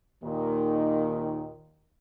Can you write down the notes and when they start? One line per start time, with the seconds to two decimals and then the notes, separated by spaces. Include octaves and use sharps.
0.24 D#2 A#2 D#3